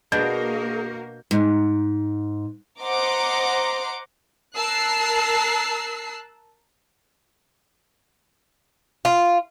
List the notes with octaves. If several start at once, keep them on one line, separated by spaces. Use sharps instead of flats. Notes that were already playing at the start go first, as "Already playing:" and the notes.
B2 A#3 D4 F#4 G#4 A#4 G6
G#2
C5 D#5 F#5 A#5 C6 D6
A#4 A5 E6 F#6 C7
F4